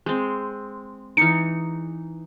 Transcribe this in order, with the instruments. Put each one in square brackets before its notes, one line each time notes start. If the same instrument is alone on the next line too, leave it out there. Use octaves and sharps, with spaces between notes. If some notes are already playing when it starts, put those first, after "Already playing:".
[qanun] G#3 C4
[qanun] E3 D#4 [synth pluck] C#7